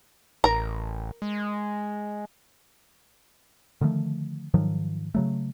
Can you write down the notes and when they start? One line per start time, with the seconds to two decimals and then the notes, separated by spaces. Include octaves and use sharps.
0.44 A1 A#4 A#5
1.22 G#3
3.81 D3 D#3 F3 A3
4.54 G#2 D#3 F3 F#3
5.15 C#3 F#3 A3